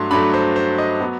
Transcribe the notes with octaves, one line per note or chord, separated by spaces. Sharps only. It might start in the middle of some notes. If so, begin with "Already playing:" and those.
Already playing: G2 F#3 A3 C6
G2 F#3 A3 B5
C5
C5
D#5
F#3 B3